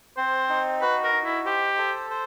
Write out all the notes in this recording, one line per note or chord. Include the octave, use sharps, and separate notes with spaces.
C4 C5
D#4
F#4 B4
A#4
D#4
E4
G4 C5
A4
C5